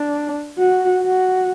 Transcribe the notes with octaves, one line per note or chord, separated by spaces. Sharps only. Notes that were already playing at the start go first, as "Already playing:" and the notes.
Already playing: D4
F#4
F#4